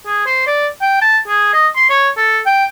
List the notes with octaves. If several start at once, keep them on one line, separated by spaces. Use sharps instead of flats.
G#4
C5
D5
G5
A5
G#4
D#5
C6
C#5
A4
G5